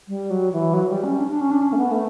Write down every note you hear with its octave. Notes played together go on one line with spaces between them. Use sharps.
G3
F#3
E3
F#3
G3
C#4
D4
D4
C#4
D4
C#4
A3
B3
A3